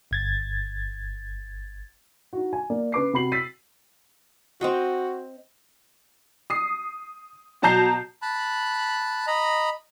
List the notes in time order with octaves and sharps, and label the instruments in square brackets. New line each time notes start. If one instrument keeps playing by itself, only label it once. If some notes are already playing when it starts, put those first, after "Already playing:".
[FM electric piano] G1 G#6 A6
[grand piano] D#4 F#4
G#5
A#3 D5
C#3 B4 D6 C7
C3 F#4 B5 C7 F#7
E6 A6 B6 C7 D#7
[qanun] C4 D#5 G5 [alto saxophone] F#4
[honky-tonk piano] D#6 C7
B2 F#3 A5 A#5 G6 C7
[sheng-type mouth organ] A5 B5 F#6
D#5 A#5 B5